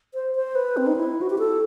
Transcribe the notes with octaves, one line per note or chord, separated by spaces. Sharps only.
C5
C5
B4
C4
D#4
E4
F#4
G4
A4